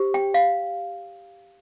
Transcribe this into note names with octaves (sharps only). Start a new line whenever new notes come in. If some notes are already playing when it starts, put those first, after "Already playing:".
Already playing: G4 C5
G5
F5